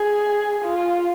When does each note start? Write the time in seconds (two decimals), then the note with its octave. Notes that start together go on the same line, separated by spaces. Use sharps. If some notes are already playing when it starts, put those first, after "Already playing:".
Already playing: G#4
0.64 F4